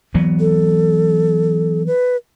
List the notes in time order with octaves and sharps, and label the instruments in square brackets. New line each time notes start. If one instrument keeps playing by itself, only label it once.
[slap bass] E3 F#3 B3
[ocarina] A4
B4